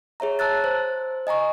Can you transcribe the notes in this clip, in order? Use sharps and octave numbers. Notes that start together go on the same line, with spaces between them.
G#4 C#5 E5 A#5
A5 A#5 E6 F#6 A6
C5
D#5 G#5 A#5 C#6